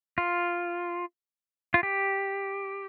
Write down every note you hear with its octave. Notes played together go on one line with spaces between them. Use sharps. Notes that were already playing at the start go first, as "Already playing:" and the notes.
F4
F4
G4